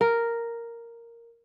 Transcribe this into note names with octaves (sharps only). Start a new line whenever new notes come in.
A#4